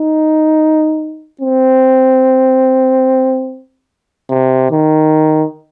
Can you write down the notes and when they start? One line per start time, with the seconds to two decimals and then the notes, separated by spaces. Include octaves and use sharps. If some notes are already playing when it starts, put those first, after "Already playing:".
Already playing: D#4
1.41 C4
4.30 C3
4.71 D#3